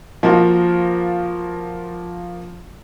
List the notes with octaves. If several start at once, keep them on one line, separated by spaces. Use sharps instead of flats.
F3 A#3 F4 F#4